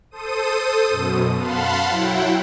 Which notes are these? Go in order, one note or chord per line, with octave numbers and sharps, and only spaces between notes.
A4 C5 D#6 D#7
F#2 B2
F5 F#5 A5 B5 C6
F#3 E4 F#5 G5